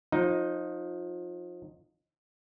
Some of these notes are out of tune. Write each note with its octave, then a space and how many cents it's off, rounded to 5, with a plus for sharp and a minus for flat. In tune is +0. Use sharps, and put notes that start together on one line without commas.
F3 +25 D#4 +0